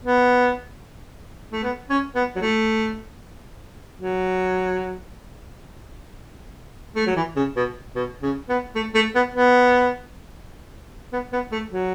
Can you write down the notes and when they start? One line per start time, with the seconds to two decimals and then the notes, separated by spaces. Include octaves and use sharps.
0.04 B3
1.52 A3
1.63 B3
1.89 C#4
2.15 B3
2.36 F#3
2.41 A3
4.00 F#3
6.95 A3
7.06 F#3
7.16 E3
7.36 C#3
7.56 B2
7.95 B2
8.22 C#3
8.49 B3
8.75 A3
8.94 A3
9.15 B3
9.34 B3
11.12 B3
11.32 B3
11.51 A3
11.72 F#3